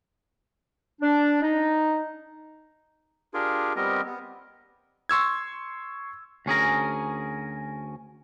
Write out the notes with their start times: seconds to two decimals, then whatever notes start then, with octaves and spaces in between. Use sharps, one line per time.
1.02 D4
1.43 D#4
3.34 D4 F4 G4 G#4 A#4
3.76 G3 B3 C4 G4 A#4 D#5
4.05 B3
5.09 C6 C#6 E6 G#6
6.46 D2 C#4 G#4 A#4